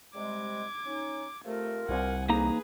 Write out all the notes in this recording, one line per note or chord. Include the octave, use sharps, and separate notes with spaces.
C3 G3 G#3 D6 G#6
C#4 D#4
C3 A3 F4 A#4
C2 F#5 G#5
F2 E3 A#3 D#4 G#4 B4 A#5